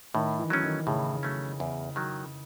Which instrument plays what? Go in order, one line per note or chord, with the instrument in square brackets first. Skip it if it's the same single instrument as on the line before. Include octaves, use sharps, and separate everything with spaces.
[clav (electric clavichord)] A2 [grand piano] D#3
[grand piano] E3
[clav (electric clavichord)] F#3 A3 C#4
[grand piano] D#3
[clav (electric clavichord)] A2 [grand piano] C#3
[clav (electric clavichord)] F#3 A3 C#4
E2
D#3 F#3